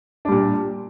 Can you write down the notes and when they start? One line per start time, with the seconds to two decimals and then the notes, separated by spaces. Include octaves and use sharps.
0.25 D4
0.28 G3
0.32 A#2